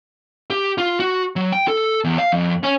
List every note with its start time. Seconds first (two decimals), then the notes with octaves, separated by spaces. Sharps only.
0.50 G4
0.78 F4
1.00 F#4
1.36 F#3
1.52 G5
1.68 A4
2.04 E2
2.18 F5
2.33 F2
2.63 C#4